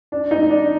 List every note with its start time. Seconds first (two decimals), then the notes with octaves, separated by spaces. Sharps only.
0.12 D4
0.31 D#4
0.50 D4